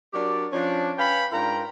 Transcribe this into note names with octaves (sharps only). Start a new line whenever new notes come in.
F#3 D4 G4 A#4 D5
F3 C#4 D4
C#4 B4 F5 G5 B5
G#2 D4 F4 A#4 G5 A#5